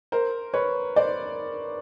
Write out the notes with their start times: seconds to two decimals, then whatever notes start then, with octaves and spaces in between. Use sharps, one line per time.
0.12 A#4 C5
0.54 B4 C#5
0.96 C5 D5